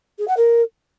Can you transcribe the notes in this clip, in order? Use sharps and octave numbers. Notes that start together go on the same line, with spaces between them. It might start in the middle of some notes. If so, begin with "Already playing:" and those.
G#4
F#5
A#4